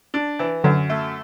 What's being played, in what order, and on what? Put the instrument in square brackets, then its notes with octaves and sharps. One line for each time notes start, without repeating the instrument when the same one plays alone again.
[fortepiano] D4
E3
[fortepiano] F#2 [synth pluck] D3 F#3
[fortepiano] A3